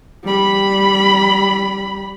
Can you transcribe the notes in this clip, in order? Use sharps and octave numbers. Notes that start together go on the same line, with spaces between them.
G3 B5